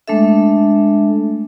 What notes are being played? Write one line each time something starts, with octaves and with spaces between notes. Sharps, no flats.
G#3 A3 D4 A4 E5